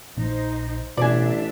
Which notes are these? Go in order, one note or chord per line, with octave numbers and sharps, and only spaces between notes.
A#1 D#4 C5
A1 B2 D4 D5 E5 G#5